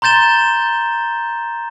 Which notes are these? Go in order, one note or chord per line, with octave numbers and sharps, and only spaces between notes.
A#5 C6 G6 A6 E7 G7